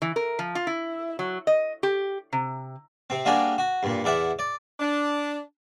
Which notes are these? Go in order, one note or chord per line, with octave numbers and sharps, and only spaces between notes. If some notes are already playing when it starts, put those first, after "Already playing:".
E3
A#4
F3
F4
E4
F#3
D#5
G4
C3
C3 C4
G3 A#3 D4 F#4 G#4
F#4
G2 A#2
E2 D5 E5 F#5
D5
D4